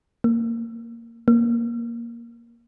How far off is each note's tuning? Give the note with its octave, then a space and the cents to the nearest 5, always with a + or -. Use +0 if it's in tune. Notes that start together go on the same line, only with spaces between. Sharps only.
A#3 -15
A#3 +5